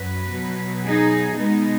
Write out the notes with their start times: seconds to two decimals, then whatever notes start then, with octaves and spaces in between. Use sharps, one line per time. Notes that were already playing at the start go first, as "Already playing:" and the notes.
Already playing: F#2 F#3 F#4 B4
0.32 B2 F#3
0.84 D#4 G#4
1.37 B2 G#3 B3 D#4